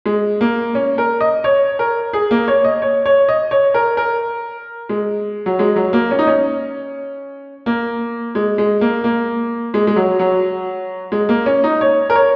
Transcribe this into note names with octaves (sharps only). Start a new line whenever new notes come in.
G#3
A#3
C#4
A#4
D#5
C#5
A#4
G#4
A#3
C#5
D#5
C#5
C#5
D#5
C#5
A#4
A#4
G#3
F#3
G#3
F#3
A#3
C#4
D#4
C#4
A#3
G#3
G#3
A#3
A#3
G#3
G#3
F#3
F#3
G#3
A#3
C#4
D#4
C#5
A#4
C#5